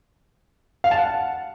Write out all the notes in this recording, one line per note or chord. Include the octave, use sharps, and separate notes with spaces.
F5
A5
F#5